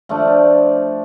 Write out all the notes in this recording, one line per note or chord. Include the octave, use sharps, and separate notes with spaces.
F3 A3 D4